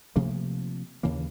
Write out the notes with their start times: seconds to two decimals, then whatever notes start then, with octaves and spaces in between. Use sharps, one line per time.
0.16 C3 F3 A3 A#3
1.03 D#2 C#3 E3 A#3